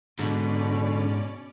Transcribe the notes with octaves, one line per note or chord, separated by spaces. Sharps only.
G#2 B2 D3 C#4 D5